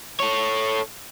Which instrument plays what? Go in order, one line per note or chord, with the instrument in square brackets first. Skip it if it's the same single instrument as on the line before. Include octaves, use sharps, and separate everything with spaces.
[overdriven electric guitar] A4 C#5